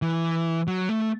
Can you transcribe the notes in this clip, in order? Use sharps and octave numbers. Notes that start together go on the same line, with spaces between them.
E3
F#3
A3